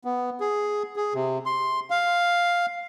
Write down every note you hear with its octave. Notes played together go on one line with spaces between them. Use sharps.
B3
G#4
G#4
C3
C6
F5